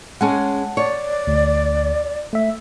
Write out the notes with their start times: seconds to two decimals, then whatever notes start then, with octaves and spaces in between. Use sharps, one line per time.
0.21 G#3 C#4 G#4 F#5 A5
0.77 C#5 D5
1.27 D2
2.33 A3 E5